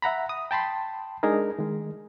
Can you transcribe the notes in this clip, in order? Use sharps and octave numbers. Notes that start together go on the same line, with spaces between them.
E5 F#5 A#5 B5
D#6
G5 A5 B5 C6
G#3 D4 D#4 G#4 A#4
D#3 G#3